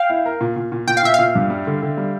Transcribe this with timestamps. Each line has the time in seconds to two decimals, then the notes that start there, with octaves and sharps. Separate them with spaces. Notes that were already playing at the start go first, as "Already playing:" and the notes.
Already playing: F5 G5
0.10 E4
0.26 A#4
0.41 A#2
0.56 A#2
0.72 A#2
0.87 A#2 G5
0.97 F5
1.03 A#2 E5
1.14 A#2 F5
1.35 G2
1.50 G3
1.67 D3
1.82 D3
1.97 G3